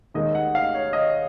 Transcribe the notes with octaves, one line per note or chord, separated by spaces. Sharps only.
D#2 D#3 G#3 D#5
F#5
F5
C#5
D#5